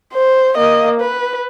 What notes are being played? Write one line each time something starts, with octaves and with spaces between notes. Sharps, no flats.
C5
A#3 D#5
B4